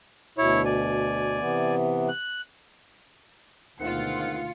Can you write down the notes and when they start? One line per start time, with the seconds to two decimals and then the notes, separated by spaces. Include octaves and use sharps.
0.38 D2 B2 E4 C#5
0.65 D5 G#5
1.40 C3 E3 B3
2.09 F#6
3.80 D2 B2 D#3 G#3 C4 F4 F#5 C#7